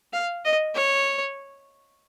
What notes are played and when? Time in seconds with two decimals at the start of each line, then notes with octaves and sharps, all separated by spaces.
0.13 F5
0.45 D#5
0.74 C#5